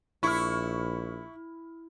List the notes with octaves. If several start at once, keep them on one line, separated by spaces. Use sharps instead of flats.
A#1 E4 C#6 F6